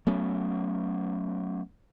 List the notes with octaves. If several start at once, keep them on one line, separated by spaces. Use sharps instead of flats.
F#3 A3 B3 C#4